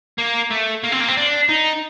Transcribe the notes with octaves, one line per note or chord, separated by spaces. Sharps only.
A#3
A3
A#3
C4
A#3
C4
D4
D#4